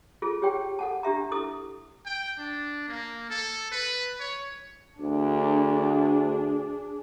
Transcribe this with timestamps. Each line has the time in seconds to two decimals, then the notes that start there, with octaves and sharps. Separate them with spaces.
0.22 F4 G#4 A4
0.42 G4 G#4 C#5 G5
0.79 A4 F#5 A5
1.03 D4 G4 E5 A#5
1.31 E4 A4 D#6
2.06 G5
2.38 D4
2.88 A#3
3.30 A4
3.71 B4
4.20 C#5
5.00 D2 D4 G#4